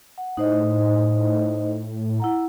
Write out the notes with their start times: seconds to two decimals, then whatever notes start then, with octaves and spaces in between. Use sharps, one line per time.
0.18 F#5
0.37 A2 D#4 C5 D#5
2.20 E4 F#5 A#5